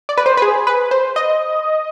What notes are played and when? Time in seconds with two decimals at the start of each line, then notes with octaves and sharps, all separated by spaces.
0.09 D5
0.18 B4
0.26 C5
0.37 B4
0.42 G#4
0.67 B4
0.91 C5
1.16 D#5